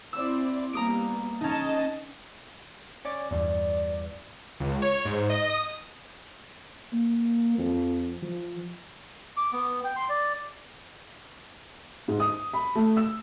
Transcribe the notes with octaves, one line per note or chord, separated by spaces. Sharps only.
C4 E4 D5 E6
G3 A#3 B3 A#5 D#6 D7
C#4 D#4 D#5 A5
C#4 D5
E2 G2 D5
C#2
C#5
G#2
D#5
D#6
A#3
F2
F3
D6
B3
G5
C6
D5
G#2
D#6
B5
A3
E6